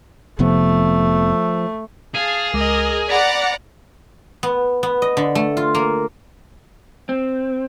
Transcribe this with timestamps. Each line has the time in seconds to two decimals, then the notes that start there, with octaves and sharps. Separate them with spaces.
0.39 F1 C3 F3 A3 B3
2.14 G#4 F5 A5
2.54 C#2 G#3 A#4 D#5 D6
3.09 D5 F#5 A#5 B5 D6 B6
4.43 B3
4.83 B3
5.02 D#5
5.17 D3
5.35 A3
5.57 F4
5.75 A#3
7.09 C4